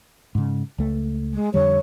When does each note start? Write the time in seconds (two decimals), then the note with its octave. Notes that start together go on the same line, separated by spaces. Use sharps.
0.35 G#2 C#3
0.78 C#2 A3
1.34 G#3
1.54 F2 D3 G3 C#5